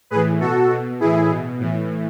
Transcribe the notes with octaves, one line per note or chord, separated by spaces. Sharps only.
A2 E3 G#4 B4
B2 F#4 A4
B2
A2 E3 E4 G#4
B2
A2 E3